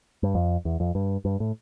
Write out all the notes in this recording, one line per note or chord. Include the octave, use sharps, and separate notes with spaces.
G2
F2
E2
F2
G2
G2
A2